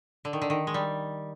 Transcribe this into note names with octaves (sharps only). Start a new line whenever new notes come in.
D3
D#3
D3
D#3
G#3
G3